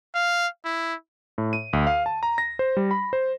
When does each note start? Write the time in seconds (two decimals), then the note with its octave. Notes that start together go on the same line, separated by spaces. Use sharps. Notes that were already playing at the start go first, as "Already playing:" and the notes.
0.15 F5
0.65 E4
1.38 A2
1.53 D#7
1.73 D2
1.87 F5
2.06 A5
2.23 A#5
2.38 A#6
2.59 C5
2.77 G3
2.91 B5
3.13 C5